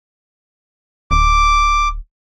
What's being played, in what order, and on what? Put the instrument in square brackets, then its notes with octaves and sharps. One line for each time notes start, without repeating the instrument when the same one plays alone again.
[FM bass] D1 [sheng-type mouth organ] D6